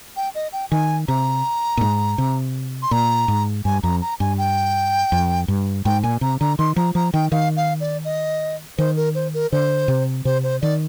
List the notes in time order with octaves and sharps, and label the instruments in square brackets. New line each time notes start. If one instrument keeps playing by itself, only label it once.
[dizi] G5
D#5
G5
[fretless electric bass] D#3 [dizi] G#5
[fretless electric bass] C3 [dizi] A#5
[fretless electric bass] A#2
G#2
C3
[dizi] C6
[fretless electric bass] A#2 [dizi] A#5
[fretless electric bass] G#2
[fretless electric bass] G2 [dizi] G#5
[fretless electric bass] F2 [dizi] A#5
[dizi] A#5
[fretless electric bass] G2 [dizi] G#5
[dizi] G5
[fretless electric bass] F2
G2
[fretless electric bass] G#2 [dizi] G5
[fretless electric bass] A#2 [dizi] G#5
[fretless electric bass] C3 [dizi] A#5
[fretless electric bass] D3 [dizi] A#5
[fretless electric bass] D#3 [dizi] C6
[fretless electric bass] F3 [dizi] A#5
[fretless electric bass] F3 [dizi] A#5
[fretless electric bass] D#3 [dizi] G5
[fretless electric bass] D#3 [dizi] F5
[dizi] F5
D5
D#5
[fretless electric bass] D#3 [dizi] C5
[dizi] A#4
C5
A#4
[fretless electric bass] D3 [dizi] C5
[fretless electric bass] C3
[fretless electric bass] C3 [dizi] C5
[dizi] C5
[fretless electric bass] D#3 [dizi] D5